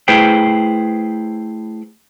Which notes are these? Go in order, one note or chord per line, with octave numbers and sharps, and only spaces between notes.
A3 E4 G#4 B4 C5 G5